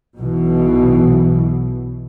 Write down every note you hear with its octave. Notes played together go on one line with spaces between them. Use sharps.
B1 B2 E3